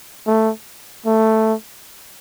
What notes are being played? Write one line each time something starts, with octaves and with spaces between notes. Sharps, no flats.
A3
A3